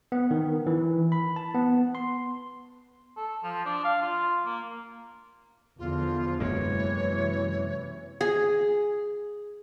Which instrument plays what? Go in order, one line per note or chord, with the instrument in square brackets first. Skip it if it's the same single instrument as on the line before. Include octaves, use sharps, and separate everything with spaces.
[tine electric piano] B3
D#3
E3
B5
A5
B3
C6
[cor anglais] A4
F3
D4
F5
F4
A#3
[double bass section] E2 D3 F3 [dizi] F4
[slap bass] F#2 G#3 A#3 [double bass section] C3 E3 [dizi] C#5
[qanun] G#4